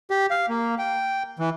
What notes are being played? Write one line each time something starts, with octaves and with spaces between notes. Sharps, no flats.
G4
F5
A#3
G5
E3